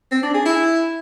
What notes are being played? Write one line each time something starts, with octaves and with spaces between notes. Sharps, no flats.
C4
D4
G#4
E4